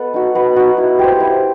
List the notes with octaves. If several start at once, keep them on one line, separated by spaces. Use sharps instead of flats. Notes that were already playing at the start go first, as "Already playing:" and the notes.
Already playing: B3 A4 D#5
D#4 F#4
B3
D#4 F#4
E4
G4 C5
E4